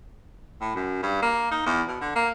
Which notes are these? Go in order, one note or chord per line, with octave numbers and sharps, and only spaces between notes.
A2
F#2
G2
A#3
D#4
E2
B2
D3
A#3